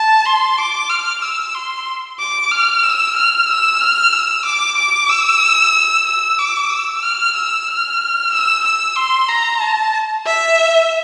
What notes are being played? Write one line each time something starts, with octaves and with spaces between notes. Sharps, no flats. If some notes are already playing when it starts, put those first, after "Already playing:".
Already playing: A5
C6
D6
F6
E6
C6
D6
F6
E6
F6
E6
F6
E6
D6
D6
E6
E6
D6
E6
F6
E6
F6
E6
E6
C6
A#5
A5
E5